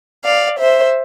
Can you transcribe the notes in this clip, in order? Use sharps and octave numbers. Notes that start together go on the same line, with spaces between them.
D5 F5
C5 E5